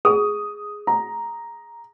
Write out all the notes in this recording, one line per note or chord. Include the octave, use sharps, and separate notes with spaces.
G#4 D#6
A#5